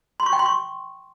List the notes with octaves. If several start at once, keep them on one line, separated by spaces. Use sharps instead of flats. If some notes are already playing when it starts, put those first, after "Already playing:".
C6
C#6
G5
C6
C#6